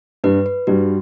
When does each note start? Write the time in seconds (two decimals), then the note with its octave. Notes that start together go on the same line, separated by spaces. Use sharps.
0.24 G2 G3 B4
0.46 B4
0.67 G2 G3 F#4